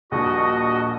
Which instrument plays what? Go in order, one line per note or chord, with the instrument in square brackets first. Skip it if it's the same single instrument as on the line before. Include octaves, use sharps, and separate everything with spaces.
[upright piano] D#1 A#1 [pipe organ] F#4 D#5